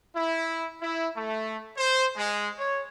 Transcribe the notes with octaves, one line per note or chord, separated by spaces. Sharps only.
E4
E4
A3
C5
G#3
C#5